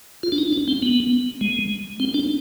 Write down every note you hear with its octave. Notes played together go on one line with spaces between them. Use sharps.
F4
D4
D#4
D4
C4
B3
G#3
C4
D4